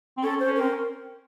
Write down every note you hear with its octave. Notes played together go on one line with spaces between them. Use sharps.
C4
C#4 A4
C5
C#4
C4 A#4